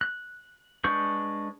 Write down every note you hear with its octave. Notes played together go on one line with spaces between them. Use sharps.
F#6
G#3 D4 B4 C#6 G6